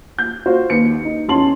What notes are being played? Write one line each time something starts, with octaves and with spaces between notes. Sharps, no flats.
G6
F4 F#4 C5
D#2 B4 C#7
D#4
E2 C#4 A5 C6 F#7